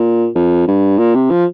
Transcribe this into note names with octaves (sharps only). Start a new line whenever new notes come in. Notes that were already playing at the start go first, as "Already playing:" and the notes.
Already playing: A#2
F2
G2
A#2
C3
F3